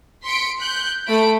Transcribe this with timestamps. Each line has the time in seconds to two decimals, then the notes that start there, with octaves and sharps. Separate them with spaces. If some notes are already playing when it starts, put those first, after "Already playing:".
0.24 C6 B6 C#7 D7
0.60 F#6 G6
1.08 A3 B5 D7